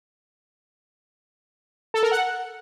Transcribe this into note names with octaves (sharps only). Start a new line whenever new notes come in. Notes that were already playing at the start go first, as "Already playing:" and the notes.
A4
A#4
F#5